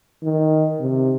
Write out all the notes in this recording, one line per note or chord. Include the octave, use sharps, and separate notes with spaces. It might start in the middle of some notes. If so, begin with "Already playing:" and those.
D#3
C3